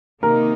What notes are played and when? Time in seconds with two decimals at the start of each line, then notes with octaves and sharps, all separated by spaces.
0.22 C3 D#3 A#3 D#4 A#4